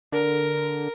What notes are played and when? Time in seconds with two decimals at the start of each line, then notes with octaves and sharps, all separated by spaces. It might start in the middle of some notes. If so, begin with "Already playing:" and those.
0.12 D3 A#4